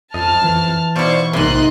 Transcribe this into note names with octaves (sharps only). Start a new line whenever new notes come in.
F2 D#5 A5 F6
E3
B2 E4 C5 D5 F5 C#6
A#1 G#2 C3 A#3 D#5 C6 F#6